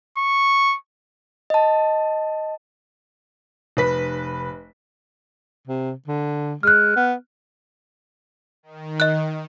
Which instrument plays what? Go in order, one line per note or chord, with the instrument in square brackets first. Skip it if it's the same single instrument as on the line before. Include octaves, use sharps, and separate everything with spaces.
[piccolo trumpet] C#6
[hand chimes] D#5 A5
[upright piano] F1 B4 B6
[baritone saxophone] C3
D3
[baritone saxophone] G#3 [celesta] F6 F#6
[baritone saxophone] B3
[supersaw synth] D#3
[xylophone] D#5 F#6